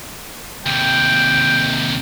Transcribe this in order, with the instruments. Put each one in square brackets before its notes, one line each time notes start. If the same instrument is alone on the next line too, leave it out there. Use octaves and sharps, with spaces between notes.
[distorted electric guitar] D#2 C3 [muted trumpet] G5